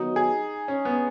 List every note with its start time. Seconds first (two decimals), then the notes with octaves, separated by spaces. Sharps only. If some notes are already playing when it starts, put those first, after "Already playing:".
Already playing: D#3 F#3 B3 D#4 F#4
0.16 G#4
0.68 C#4
0.85 B3